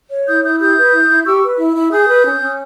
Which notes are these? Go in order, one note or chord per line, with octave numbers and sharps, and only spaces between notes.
C#5
E4 D#6 G6
E4 D#6 G6
G4 D#6 G6
B4
E4
E4
G4 C#6 E6
B4
E4
E4
G#4 D#6 G6
B4
C#4
C#4